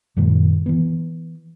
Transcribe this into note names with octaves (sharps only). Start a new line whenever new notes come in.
F#2 A#2 D#3 G#3
E3 B3